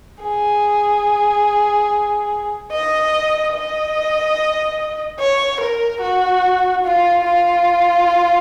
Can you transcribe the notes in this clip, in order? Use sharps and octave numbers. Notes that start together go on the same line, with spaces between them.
G#4
D#5
D#5
C#5
A#4
F#4
F4
F4